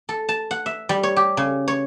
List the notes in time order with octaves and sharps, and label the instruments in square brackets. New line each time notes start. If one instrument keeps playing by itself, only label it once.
[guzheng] A4
A5
F#5
E5
G3
C#5
G4
C#3
C#5